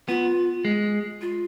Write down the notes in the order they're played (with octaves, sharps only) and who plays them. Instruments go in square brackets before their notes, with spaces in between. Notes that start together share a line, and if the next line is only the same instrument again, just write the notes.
[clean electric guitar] B3 [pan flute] F4
[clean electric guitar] G#3
[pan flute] F4